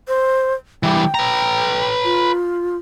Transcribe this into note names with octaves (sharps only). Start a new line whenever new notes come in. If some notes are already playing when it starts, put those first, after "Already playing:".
C5
E3 G3 G5
B4 A#5
F4